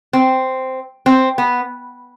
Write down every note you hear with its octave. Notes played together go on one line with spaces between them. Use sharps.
C4
C4
B3